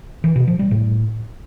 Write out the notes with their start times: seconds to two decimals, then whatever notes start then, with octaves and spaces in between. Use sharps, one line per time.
0.24 E3
0.36 B2
0.48 F3
0.59 G3
0.71 A2